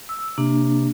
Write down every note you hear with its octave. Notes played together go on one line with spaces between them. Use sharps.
E6
C3 A#3 D4